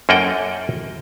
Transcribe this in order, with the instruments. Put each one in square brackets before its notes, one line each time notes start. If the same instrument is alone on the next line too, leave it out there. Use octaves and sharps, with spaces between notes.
[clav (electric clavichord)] F#2 A#3 A4 D#5 F#5 G5